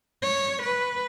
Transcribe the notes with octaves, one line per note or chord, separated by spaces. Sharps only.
C#5
B4